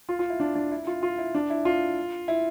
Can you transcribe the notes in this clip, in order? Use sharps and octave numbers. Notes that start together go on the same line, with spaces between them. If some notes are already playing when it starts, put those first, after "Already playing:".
F4
F4
E4
D4
D4
E4
F4
F4
E4
D4
E4
F4
E4